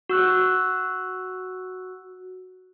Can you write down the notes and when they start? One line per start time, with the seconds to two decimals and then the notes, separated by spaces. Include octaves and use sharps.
0.09 F#4 E6 F#6